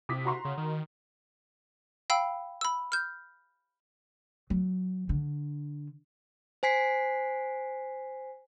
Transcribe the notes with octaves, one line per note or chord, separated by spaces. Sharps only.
C3 D6 D#6 B6
F#4 A#5 C6
C#3
D#3
F5 G5 B5 E6
B5 E6
F6 G6
F#3
D3
C5 G#5 B6 C7